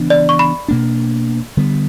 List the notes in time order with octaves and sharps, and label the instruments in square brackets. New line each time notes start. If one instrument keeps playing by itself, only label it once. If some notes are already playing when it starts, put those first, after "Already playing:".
Already playing: [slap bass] C#3 E3 B3 D4
[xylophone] D5
C#6
B5
[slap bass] B2 A#3 D4
D3 G3 B3